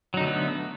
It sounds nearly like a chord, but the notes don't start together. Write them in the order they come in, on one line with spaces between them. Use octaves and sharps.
F#3 D#4 D3 A3 B3